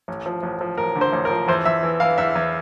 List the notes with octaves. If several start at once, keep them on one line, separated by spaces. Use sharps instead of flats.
A1
F3
A1
F3
A1 A#4
D3
C5
A1
A#4
F3
E2 C5
E2 E5
E3
E3 F5
E2 E5
E2